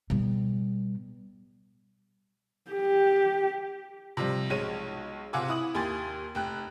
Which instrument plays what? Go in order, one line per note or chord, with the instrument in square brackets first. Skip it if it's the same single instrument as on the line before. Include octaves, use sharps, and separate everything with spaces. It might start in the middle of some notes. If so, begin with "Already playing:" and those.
[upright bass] B2 G3
[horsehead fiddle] G4
[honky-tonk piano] C3 F3 G3
B1 G#3 C#5 D#7
C3 F4 F#5 G#5 D6 E6
E4 D#6 F#7
D#2 G4 G#5 C6 A6
F1 G5 F#6